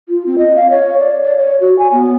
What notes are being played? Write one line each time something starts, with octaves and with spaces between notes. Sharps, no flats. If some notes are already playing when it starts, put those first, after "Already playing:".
F4
C4
D#5
F5
C#5
D5
D5
C#5
F#4
G#5
B3